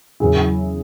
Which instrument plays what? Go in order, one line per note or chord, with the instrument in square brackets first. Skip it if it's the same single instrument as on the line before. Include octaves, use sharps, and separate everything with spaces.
[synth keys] E2 C#3 F#3 E4 [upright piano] G#4